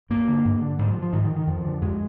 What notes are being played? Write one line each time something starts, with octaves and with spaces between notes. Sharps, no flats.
G2 A#3
D3
G2
D3
G#2 G3
F3
F3
G#2 D#3
D#3
D#3
F2 F3
D3
F2 G#3